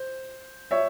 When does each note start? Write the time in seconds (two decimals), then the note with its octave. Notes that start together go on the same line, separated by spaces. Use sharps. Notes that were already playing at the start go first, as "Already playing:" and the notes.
Already playing: C5
0.71 C#5 E5